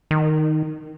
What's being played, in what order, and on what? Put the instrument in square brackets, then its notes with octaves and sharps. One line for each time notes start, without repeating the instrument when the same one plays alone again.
[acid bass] D#3